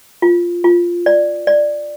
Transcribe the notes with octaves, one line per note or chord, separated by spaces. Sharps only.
F4
F4
D5
D5